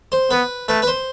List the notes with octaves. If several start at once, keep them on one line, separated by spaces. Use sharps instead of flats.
C5
B3 B4
A3 B4
B4
C5